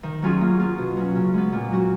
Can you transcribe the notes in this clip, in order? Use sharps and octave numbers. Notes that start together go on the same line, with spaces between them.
D#3
F#3 C#4 F4 G#4
A#3
F4 G#4
B2
F#3 C#4
C#3
G#3 B3
A#2
F#3 C#4 F#4